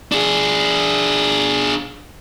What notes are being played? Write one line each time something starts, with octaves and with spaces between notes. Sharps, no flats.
D4 G#4